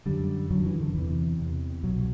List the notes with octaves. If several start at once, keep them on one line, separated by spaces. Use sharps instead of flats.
F#2 D3 G3
F#2 D3 F#3
E3
D3
E2 C3 E3
E2 C3
C2 B2 F#3